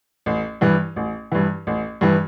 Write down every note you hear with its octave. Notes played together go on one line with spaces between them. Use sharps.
A1
G2 E3
A1
G2 E3
A1
G2 E3